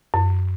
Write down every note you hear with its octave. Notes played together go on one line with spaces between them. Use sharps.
F#2